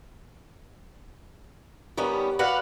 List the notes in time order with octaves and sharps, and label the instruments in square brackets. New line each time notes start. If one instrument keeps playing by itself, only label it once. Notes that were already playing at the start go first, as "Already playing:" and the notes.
[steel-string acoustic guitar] D#3 G3 B3 C#4
F#4 B4 D5 F5 F#5